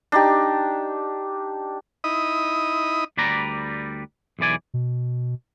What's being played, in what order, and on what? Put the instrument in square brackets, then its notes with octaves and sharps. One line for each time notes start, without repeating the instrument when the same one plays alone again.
[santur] D4 D#4 G4
[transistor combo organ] D#4 E4 D#5 B5 D#6
[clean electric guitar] D2 G3 B4 D5 A#5
B1 E2 E3 D5 G#5
[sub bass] B2